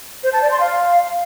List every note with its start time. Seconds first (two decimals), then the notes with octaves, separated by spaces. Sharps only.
0.24 C5
0.33 A5
0.42 D5
0.51 C6
0.60 F5